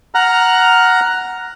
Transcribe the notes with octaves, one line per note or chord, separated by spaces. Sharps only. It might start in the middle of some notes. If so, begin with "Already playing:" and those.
F#5 A#5 F6 F#6